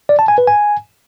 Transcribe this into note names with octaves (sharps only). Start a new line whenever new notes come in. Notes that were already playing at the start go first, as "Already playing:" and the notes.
D5
A5
G#5
B4
G#5